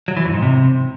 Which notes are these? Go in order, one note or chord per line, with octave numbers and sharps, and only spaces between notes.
F#3
E3
F2
G#2
C3